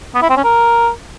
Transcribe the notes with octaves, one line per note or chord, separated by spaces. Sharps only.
B3
E4
C4
C#4
A#4